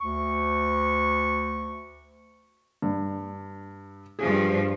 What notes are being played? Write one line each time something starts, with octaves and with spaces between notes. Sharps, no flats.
D2 C#6
G2
G2 F3 G#4